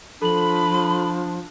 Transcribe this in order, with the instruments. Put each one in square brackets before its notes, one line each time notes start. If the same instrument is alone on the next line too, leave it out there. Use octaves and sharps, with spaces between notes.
[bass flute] F3 [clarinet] D4 [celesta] A4 F#7 [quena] B5